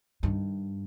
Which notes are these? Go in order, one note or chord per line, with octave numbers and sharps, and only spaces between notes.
G2 D#3